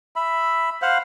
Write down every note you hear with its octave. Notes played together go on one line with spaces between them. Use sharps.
E5 B5
C5 F5 F#5